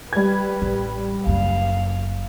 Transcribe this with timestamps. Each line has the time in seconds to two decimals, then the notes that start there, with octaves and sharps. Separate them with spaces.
0.13 G3 B4 G#6
0.62 A1
1.27 F#1 F#2 F5